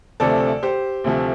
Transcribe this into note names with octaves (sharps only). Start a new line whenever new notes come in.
D2 C3 F3 A3 A4 D5
G4 C5
D2 C3 F3 A3